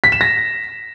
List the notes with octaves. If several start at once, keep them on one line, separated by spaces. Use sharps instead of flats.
B6
E7
A#6